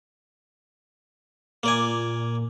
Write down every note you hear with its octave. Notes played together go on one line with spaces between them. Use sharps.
A#2 A#3 D5 G#5